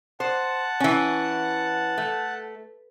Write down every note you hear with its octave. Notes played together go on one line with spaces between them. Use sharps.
C5 F#5 A5
E3 C#4
A3